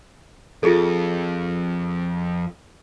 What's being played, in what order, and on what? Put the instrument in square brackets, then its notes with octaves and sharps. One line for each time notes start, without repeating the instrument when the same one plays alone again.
[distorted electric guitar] F2 [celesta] F4 G#4 A4